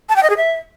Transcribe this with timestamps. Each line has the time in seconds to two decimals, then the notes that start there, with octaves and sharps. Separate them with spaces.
0.09 A5
0.16 G5
0.23 D#5
0.30 G#4
0.37 E5